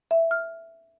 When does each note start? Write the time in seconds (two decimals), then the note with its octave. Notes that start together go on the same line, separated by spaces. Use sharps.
0.11 E5
0.31 F6